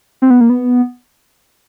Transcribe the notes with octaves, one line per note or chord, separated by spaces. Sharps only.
C4
B3
A#3
B3